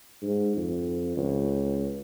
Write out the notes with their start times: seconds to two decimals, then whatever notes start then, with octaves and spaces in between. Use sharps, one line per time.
0.22 G#2
0.56 F2
1.17 C#2